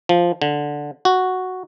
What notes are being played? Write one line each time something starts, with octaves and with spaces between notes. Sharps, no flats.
F3
D3
F#4